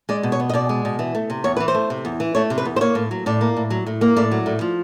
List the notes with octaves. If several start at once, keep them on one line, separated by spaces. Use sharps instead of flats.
G#3 D5
B2
C#5
B3
D#5
B2 D5
G#3
B2
E3
A3
C3
E2 C#5
E3 B4
C5
A3
C3
E2
E3
A3 C#5
C3
B4
E2
C5
A#3 C#5
A2
F#3
A2 D5
A#3
A2
F#3
A2
A#3
A2 D5
F#3
A2
F3